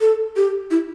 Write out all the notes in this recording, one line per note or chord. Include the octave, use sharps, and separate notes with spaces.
A4
G4
E4